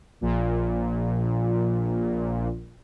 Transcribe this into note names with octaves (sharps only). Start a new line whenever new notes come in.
A#1 A#2